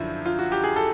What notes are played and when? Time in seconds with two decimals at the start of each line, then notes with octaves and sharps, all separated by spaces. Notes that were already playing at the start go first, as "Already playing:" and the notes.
Already playing: F#2 D3 F3 E4 F4
0.26 F4
0.39 F#4
0.52 G4
0.64 G#4
0.76 A4